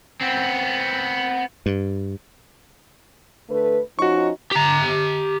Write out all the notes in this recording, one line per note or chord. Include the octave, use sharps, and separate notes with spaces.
B3 C4
G2
D3 A3 B4
F3 C#4 D#4 F#4 C#6
G4 A#5